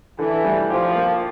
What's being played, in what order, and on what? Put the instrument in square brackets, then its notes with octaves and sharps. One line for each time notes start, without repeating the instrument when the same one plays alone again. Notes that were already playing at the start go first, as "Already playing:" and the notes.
[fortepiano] D3 [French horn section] E3
[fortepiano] G3
[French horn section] F3 [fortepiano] G4
[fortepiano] A#3